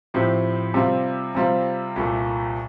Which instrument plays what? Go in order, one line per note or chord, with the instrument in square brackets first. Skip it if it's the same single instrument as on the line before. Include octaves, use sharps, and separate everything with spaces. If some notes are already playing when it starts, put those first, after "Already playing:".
[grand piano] A2 F3 C4 G4
C3 G3 C4 F4
C3 G3 C4 F4
C2 A#2 A3